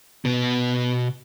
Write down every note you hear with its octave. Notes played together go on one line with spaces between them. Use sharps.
B2 B3